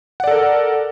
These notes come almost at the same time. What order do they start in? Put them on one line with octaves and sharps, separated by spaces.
F#5 D5 A4 A#4